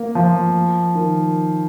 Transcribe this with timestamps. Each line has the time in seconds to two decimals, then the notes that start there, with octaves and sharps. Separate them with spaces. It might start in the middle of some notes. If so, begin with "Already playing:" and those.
Already playing: A#3
0.15 F3
0.95 D#3